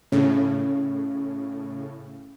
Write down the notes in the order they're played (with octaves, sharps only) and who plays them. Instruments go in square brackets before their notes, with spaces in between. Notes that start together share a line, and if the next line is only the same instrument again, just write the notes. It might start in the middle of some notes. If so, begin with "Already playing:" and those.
[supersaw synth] A2 C#3 [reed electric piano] C#4